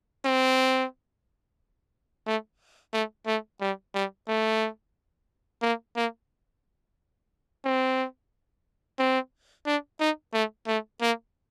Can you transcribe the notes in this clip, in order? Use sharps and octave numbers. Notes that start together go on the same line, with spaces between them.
C4
A3
A3
A3
G3
G3
A3
A#3
A#3
C4
C4
D4
D#4
A3
A3
A#3